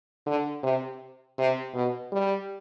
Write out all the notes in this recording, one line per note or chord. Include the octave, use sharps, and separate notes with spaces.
D3
C3
C3
B2
G3